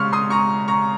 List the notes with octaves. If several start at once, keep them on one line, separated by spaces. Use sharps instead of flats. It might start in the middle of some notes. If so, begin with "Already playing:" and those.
Already playing: C#3 G#3 C6 C#6 F6
C6 D#6
A#5 C#6
A#5 C#6